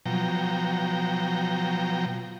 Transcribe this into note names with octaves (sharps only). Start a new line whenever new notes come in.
B2 F3 F#3 G5 A#5